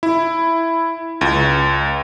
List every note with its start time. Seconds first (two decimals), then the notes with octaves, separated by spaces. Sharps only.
0.03 E4
1.21 C#2